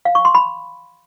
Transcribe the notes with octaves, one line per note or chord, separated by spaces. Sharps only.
F5
C#6
C6
B5